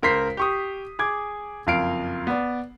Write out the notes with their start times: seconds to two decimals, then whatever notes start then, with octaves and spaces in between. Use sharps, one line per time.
0.03 C#2 A#4 C5 B6 C7
0.37 G4 C#6 D#6
0.99 G#4 D6 G#6
1.67 F#1 F2 F5 C7 D7
2.27 B3 D5